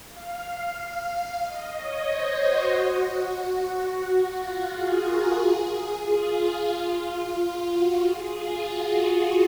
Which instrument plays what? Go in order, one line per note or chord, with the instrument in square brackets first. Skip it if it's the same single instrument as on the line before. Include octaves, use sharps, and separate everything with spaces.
[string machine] F5
D#5
C#5
C5
F#4
F#4
F4
G#4
A#4
G#4
G#4
F4
F4
F#4
G#4
F4
F#4